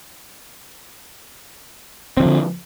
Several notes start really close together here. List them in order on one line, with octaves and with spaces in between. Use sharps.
C4 D#3 F3 D3